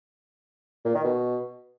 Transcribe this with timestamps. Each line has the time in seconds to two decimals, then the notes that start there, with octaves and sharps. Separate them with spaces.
0.85 A#2
0.95 D#3
1.04 B2